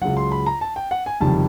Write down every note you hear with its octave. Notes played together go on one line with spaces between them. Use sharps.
C#2 C#3 F#3 F#5
C6
B5
A#5
A5
G5
F#5
G#5
F#1 F2 C3 D#3 G3 A5